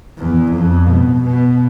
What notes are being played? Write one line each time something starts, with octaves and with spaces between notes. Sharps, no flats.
E2
F2
B2
B2